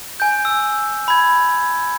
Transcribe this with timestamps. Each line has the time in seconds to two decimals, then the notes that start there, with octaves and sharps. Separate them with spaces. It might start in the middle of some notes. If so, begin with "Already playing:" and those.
0.20 G#5 G6
0.45 E6
1.08 B5 G#6